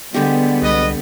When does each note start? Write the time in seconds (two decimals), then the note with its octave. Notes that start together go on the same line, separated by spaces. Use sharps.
0.14 D3 G3 G#3 B3 G4
0.62 C2 B4 D#5